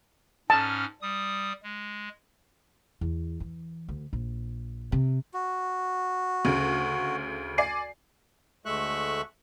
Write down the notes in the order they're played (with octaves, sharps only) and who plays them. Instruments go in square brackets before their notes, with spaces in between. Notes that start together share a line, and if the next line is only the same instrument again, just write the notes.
[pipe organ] G#2 C#4 F6 [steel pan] A5
[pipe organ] G3 D#6
G#3
[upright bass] E2
E3
D2
A#1
C3
[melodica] F#4
[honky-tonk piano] D2 C#3
D5 G#5 C7
[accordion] D2 G#3 A3 E5 C#6 F#6